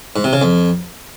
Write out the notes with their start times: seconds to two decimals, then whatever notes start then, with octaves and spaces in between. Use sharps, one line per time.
0.16 G#2
0.24 C3
0.33 C#3
0.42 F2